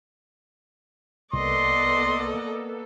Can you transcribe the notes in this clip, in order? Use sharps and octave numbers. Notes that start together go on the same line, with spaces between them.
C2 A#3 B3 A4 D5 D#5 C6